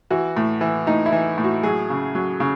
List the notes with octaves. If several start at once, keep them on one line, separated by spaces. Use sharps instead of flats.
E3 F#4
A2
E3
A2 D#4
E4
E3
A2
F#4
F#3 G#4
C#3
F#3
C#3